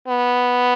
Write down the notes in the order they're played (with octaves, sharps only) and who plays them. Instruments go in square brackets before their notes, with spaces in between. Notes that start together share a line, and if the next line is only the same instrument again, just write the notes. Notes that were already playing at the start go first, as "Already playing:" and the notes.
[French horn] B3